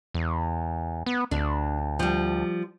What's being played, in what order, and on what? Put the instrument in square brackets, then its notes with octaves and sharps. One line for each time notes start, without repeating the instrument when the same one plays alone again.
[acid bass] E2
B3
[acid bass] D2 [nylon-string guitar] D4
[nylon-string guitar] F3 G3